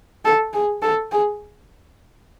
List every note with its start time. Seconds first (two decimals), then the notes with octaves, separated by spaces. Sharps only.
0.25 A4
0.53 G#4
0.82 A4
1.12 G#4